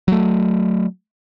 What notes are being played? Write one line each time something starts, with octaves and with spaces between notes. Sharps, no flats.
F#3 A3